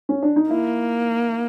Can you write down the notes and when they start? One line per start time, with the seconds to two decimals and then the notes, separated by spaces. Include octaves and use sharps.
0.09 C#4
0.23 D4
0.36 D#4
0.50 A#3 E4